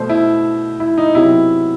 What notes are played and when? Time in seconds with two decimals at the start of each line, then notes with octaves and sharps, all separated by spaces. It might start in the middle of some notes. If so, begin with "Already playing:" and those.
Already playing: B2 A3 C5
0.09 E4
0.80 E4
0.98 D#4
1.15 C3 F#3 B3 E4